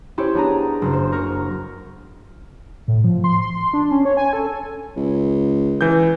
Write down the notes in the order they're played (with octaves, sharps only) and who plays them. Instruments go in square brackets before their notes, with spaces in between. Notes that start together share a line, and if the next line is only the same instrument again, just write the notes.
[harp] C#4 E4 G4 C5 C#5
B3 D4 G#4 A#5
F#1
C5
A#4 C#6 C#7
[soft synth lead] A2
F3
C6
C6
D4
C#4
C#5
G#5
A4
[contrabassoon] C#2
[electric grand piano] E3 G6